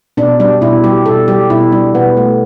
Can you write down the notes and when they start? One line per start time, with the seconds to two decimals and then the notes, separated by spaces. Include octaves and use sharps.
0.17 B2 D4
0.40 G3 D4
0.61 B2 E4
0.84 G3 G4
1.06 B2 A4
1.28 G3 G4
1.50 B2 E4
1.72 G3 D4
1.95 B2 B3
2.17 A3